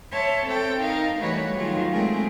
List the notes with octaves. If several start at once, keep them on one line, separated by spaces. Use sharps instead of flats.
C#5 E5 A5 C6
C4 A4 G5
D#4 A#4 D#5 F5
E3 G3 A3 F#4 B4 C#5
D#3 F#3 A3 F4 G#4
G#3 A3 C4 G#4 A#4